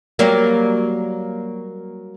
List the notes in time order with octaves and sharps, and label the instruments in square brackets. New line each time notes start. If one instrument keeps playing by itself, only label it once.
[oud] F#3 G3 A#3